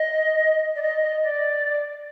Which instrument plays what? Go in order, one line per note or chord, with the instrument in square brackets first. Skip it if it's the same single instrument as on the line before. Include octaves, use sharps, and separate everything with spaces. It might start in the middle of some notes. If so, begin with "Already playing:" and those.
Already playing: [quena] D#5
D5
D#5
D#5
D5